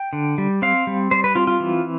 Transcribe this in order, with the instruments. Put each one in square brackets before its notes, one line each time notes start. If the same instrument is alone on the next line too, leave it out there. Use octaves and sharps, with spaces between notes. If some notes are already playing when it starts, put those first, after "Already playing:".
Already playing: [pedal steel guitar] G5
D3
G3
C4 F5
G3
G3 C5
B4
C4 F4
F4
E3